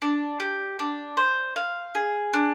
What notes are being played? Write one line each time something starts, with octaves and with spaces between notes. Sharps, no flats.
D4
G4
D4
C5
F5
G#4
D4